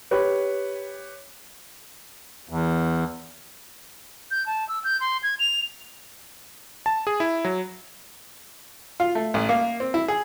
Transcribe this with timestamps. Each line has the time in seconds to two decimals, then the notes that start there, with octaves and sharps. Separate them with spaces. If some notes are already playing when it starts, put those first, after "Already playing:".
0.11 G4 B4 C#5
2.49 E2
4.31 G6
4.46 A5
4.69 E6
4.84 G6
5.00 C6
5.23 G#6
5.39 F7
6.86 A5
7.07 G#4
7.20 E4
7.45 F#3
9.00 F4
9.15 A3
9.34 A1
9.49 A#3
9.80 C4
9.94 E4
10.08 G#4